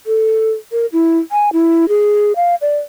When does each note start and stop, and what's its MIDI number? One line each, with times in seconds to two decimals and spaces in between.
0.07 0.51 69
0.72 0.86 70
0.93 1.18 64
1.32 1.49 80
1.53 1.88 64
1.89 2.33 68
2.36 2.55 77
2.61 2.77 74